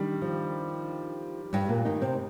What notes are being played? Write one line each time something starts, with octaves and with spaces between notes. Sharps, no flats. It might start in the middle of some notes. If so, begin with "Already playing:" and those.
Already playing: D#3 G3 D4
F3
G2 G3
A#2 A#3
D#3 D#4
C3 C4